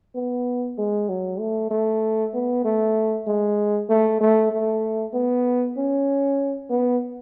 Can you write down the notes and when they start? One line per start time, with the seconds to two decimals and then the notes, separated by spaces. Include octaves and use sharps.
0.15 B3
0.78 G#3
1.09 F#3
1.39 A3
1.70 A3
2.34 B3
2.64 A3
3.27 G#3
3.89 A3
4.20 A3
4.52 A3
5.14 B3
5.77 C#4
6.70 B3